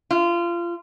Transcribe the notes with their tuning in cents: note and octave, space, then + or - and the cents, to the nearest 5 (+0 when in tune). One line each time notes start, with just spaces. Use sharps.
F4 -25